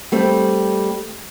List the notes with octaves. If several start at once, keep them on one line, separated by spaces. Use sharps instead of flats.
G3 A3 C4